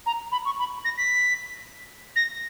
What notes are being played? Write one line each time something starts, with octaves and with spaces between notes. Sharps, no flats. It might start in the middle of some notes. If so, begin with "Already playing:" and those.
A#5
B5
C#6
B5
A#6
B6
A#6